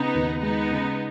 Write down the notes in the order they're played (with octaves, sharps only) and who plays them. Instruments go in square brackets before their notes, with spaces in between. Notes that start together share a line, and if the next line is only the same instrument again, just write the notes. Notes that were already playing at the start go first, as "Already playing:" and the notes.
Already playing: [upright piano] C#3 [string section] B3 D#4
[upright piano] D#2
[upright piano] G#3 [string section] B3 D#4
[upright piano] C#3